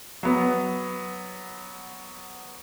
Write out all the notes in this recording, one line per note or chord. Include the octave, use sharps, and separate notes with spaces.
F#3 B3